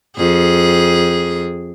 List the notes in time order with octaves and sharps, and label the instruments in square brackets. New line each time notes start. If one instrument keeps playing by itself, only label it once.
[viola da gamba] F2 G#4